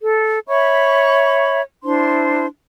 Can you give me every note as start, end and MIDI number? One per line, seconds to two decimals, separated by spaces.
0.01 0.39 69
0.48 1.61 73
0.48 1.61 76
0.48 1.61 83
0.48 1.61 85
1.84 2.46 62
1.84 2.46 64
1.84 2.46 72
1.84 2.46 84